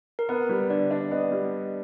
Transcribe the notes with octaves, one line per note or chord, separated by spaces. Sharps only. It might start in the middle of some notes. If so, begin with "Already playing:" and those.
A#4
B3 B4
G3
D3 D5
D4
B3 D#5
G3